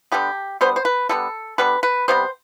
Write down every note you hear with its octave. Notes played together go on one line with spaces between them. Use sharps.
D3 G3 B3 G4
D3 G3 B3 C5
C5
B4
D3 G3 B3 A4
D3 G3 B3 B4
B4
C3 G3 B3 C5